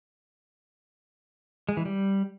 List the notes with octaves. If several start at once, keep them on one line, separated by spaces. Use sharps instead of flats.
G#3
E3
G3